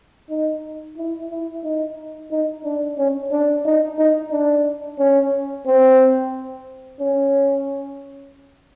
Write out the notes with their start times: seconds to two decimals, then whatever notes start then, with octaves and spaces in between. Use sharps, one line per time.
0.30 D#4
0.97 E4
1.30 E4
1.64 D#4
2.31 D#4
2.64 D4
2.98 C#4
3.31 D4
3.65 D#4
3.99 D#4
4.32 D4
4.99 C#4
5.66 C4
7.00 C#4